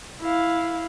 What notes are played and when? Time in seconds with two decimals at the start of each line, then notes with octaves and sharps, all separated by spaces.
0.21 E4 F5